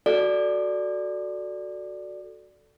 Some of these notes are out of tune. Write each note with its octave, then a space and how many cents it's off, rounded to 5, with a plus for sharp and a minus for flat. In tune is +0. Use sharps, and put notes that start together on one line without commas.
F#4 +0 A4 +0 D5 +0